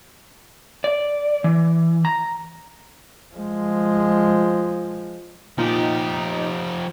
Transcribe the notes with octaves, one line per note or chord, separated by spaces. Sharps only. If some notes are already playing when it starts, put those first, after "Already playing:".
D5
E3
A#5
F3 G#3
A#2 F3 D#4 G4